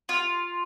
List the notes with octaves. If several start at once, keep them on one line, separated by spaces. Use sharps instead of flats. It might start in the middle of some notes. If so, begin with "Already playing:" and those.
F4